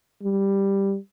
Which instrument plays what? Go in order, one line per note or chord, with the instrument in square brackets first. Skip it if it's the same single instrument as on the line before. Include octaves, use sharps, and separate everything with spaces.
[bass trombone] G3